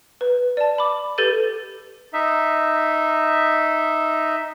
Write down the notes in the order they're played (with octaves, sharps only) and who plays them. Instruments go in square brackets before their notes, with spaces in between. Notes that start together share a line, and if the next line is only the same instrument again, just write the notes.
[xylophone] B4
D5 A5
B5 D6
G4 A4 B4 G6 A6 D#7
[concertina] D#4 E5